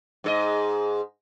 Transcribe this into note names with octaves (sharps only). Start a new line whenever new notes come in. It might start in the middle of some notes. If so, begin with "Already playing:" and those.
G#2 A4 D#5